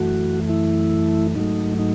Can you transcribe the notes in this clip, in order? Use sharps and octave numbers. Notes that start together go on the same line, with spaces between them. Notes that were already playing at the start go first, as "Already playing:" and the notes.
Already playing: F#2 E3 A3 F#4
E4
G#2 F#3 A3 D#4
D#4